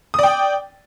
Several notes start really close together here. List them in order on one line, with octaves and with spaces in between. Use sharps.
D#6 D5 G5